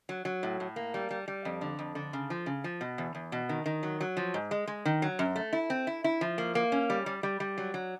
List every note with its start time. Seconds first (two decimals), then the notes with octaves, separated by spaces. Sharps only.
0.09 F#3
0.25 F#3
0.43 A2
0.60 A2
0.76 A#3
0.94 G3
1.10 G3
1.28 G3
1.45 F2
1.61 D3
1.79 F2
1.95 D3
2.13 C#3
2.30 F3
2.46 C#3
2.64 F3
2.81 B2
2.98 E2
3.15 E2
3.32 B2
3.49 D#3
3.66 D#3
3.83 F#3
4.00 F#3
4.17 F3
4.34 G#2
4.51 G#3
4.67 G#3
4.85 D#3
5.02 F#3
5.19 F#2
5.36 A3
5.53 E4
5.70 C4
5.87 E4
6.04 E4
6.21 F3
6.38 A#3
6.55 A#3
6.72 C#4
6.90 G3
7.06 G3
7.23 G3
7.40 G3
7.58 F#3
7.74 F#3